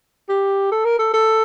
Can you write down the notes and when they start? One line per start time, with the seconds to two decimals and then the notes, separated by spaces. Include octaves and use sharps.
0.29 G4
0.71 A4
0.85 A#4
0.99 A4
1.13 A4